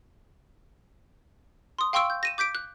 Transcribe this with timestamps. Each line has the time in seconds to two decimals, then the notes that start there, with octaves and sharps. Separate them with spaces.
1.79 C6 D#6
1.93 F5 G5 C6 C#6 E6 D7
2.10 G6
2.23 A#6 D#7 E7
2.38 D6 G6 B6 D7
2.55 F#6